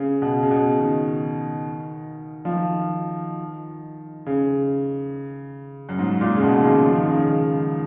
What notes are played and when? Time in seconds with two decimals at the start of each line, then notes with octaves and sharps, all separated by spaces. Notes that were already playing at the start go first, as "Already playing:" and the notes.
Already playing: C#3
0.22 B2
0.43 C#3
0.51 B2
0.80 D#3
2.45 F3
2.53 D#3
4.26 C#3
5.89 F#2
5.99 G#2
6.21 A#2
6.36 C#3
6.42 B2
6.60 D#3
6.64 C#3
6.86 F3
6.95 D#3
7.05 C#3
7.15 D#3